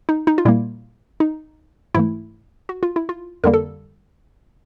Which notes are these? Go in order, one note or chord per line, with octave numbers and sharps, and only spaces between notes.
D#4
D#4
F4
A#2 G3 A#3 E4
D#4
G#2 E3 A3 E4
F#4
F4
E4
F4
F2 D3 G3 A#3 A#4
A4